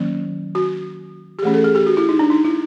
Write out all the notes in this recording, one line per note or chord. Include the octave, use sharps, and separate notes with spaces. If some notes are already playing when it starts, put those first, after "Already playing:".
Already playing: D#3 F#3 A#3 C#4
F#4
G4
E3 A3 C#4 G#4
A4
G#4
G4
F#4
E4
D#4
D4
D#4
E4